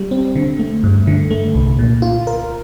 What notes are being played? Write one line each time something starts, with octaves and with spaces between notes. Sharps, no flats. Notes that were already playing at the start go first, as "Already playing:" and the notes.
Already playing: G3
C4
D3
A3
G2
D3
A3
C2
A#2
F4
A#4